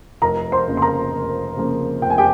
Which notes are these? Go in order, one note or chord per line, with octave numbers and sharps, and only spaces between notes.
F1 A#4 A#5
C5 C6
F2 C#3 F3 A#3
C6
A#4 A#5
F1
F2 C#3 F3 A#3
F1 G5
G#5
G4 G5